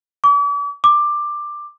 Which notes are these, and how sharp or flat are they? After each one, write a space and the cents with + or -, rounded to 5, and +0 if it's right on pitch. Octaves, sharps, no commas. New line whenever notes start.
D6 -45
D6 +10